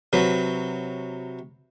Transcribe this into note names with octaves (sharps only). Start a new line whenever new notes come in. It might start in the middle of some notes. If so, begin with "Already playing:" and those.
C3 F#3 B4